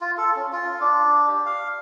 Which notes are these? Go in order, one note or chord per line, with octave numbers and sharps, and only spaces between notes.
F4
A4
C#4
F4
D4
G4
F5